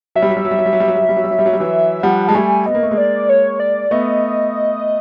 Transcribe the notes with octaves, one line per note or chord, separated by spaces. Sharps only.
F#3 E5
G3
F#3
G3
F#3
G3
F#3
G3
F#3
G3
F#3
G3
F#3
G3
F#3
G3
F#3
G3
F#3
G3
E3 F#3
F3 G3 F#5
G#3 A5
G3 A3 G#5
B3 D#5
A#3
A3
G#3 A#3
D5
C#5
D5
A3 B3 D#5